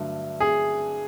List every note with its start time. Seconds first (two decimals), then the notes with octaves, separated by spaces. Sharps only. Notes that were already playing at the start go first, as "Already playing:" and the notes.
Already playing: G2 D3 F#3 A3
0.40 G#4